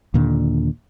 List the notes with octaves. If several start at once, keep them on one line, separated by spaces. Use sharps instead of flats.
D#2 A#2 D3